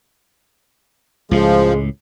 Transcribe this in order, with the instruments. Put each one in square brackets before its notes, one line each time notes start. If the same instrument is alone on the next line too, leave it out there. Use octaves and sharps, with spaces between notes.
[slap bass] C#2 A2 [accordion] F3 [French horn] G#3